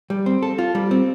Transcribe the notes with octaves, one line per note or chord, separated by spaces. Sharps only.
G3
C4
A4
F4
G3
C4